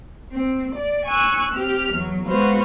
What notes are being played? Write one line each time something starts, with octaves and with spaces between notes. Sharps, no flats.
C4
D5
G#5 C#6 E6 F#6
C4 G4 F6
E2 F#3
G#3 B3 F#4 B4 C5 F5